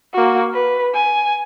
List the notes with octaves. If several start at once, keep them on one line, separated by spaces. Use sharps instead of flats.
A#3 F#4
B4
G#5